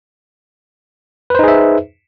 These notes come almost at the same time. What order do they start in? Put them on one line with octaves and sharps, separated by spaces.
B4 C5 D#4 G#4 E5